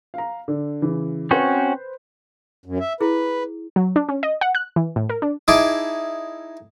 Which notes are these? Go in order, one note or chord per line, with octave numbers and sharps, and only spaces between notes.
F5 A#5
D3
C#3 E3
C4 C#4 F#4 B4 C5
F#2
E5
E4 G#4 B4
F#3
D4
C#4
D#5
F#5
F#6
E3
A2
A#4
D4
D#4 E4 G#4 A5 D6